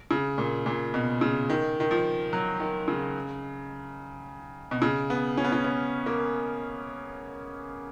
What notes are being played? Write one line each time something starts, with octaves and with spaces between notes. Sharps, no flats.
C#3
A#2
A#2
B2
C#3
D#3
D#3
F3
F#3
D#3
C#3
B2
C#3
B3
C#4
B3
C#4
B3
A#3